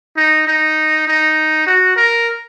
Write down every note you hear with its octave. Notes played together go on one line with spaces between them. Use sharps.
D#4
D#4
D#4
F#4
A#4